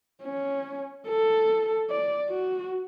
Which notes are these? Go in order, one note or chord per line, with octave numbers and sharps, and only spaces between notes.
C#4
A4
D5
F#4